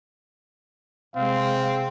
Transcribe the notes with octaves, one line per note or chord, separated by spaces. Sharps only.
C3 G#3 C4 F5